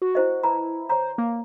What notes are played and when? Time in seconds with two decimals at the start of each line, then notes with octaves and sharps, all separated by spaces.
0.02 F#4
0.15 E4 C5 D#5
0.43 E4 B4 A5 A#5
0.89 C5 C#5 A#5
1.18 A#3